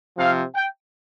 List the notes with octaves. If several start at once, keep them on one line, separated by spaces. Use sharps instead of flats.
C3 F3 F5
G5